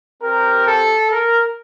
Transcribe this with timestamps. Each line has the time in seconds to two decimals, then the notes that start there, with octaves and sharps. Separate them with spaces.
0.21 C4 G4 A#4
0.67 A4
1.11 A#4